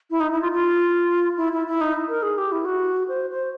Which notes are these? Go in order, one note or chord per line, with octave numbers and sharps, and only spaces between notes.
E4
D#4
E4
F4
F4
E4
E4
E4
D#4
A#4
G#4
G4
E4
F#4
C5
C5